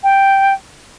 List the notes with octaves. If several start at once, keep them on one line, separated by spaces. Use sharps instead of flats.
G5